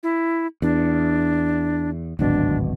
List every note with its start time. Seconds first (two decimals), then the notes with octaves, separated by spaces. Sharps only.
0.03 E4
0.62 E2 D4
2.19 D1 G#1 B2 D4